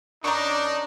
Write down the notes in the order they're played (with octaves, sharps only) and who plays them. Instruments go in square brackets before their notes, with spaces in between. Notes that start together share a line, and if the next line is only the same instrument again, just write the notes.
[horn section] F#2 D4 [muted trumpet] D#4 [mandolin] A#5 C#6